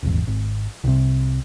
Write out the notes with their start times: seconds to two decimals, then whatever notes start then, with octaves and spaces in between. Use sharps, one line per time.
0.03 D#1 G#1 E2
0.27 G#1
0.84 C2 C3